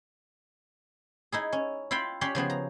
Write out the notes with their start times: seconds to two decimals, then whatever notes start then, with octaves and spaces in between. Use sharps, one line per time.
1.32 D#4 E4 G#4
1.53 C#4
1.91 E4 F4 F5 G5 B5
2.21 C#4 G4 C#5 D5 B5 C6
2.35 C#3 F3 B3 G#4
2.50 A#5